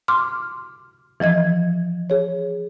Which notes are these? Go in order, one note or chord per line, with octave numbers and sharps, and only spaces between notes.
C6 D6 F6
E3 F3 D#5 G#6
G#4 C#5